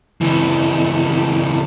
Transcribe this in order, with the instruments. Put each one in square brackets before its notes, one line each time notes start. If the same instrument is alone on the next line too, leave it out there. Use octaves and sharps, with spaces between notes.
[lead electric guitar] C#2 E3